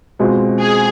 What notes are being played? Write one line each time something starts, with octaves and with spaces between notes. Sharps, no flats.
B2 G#3 C4 F4
G#4